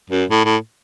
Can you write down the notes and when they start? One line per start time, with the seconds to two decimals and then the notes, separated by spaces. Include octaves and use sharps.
0.10 F#2
0.30 A2
0.45 A2